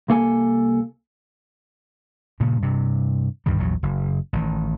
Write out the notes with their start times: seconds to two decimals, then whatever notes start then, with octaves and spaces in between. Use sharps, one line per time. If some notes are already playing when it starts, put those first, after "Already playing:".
0.08 C2 A#3 A4 G#5
2.40 G2 A#2 C#3
2.62 G2 C3
3.46 D2 G2 D#3 G3
3.58 A#1 E2 F#3
3.83 F#1
4.33 A1 D#3